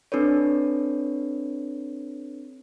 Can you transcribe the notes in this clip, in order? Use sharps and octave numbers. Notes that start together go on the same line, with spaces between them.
C4 D4 A4 B4 C#5